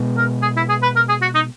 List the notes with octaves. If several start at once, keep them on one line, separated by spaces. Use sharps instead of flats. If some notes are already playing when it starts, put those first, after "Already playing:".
Already playing: B2 G#3 B3
A#4
G#4
E4
G#4
B4
A#4
G#4
F#4
D#4